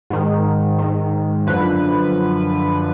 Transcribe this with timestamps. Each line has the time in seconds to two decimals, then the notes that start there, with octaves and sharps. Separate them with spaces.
0.10 G#2 D#3
0.79 G#2 D#3
1.47 F#2 D3 F3 B4